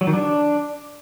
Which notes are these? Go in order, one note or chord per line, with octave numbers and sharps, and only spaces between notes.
F#3
D#3
D4